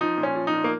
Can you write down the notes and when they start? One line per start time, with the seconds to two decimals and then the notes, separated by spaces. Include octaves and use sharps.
0.01 F3 D#4
0.17 A#2
0.23 C#4
0.35 F3
0.47 D#4
0.53 A#2
0.64 A#3